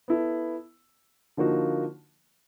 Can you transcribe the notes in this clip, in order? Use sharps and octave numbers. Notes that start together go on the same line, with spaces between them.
B3 E4 A4
D3 F3 A#3 D#4 F#4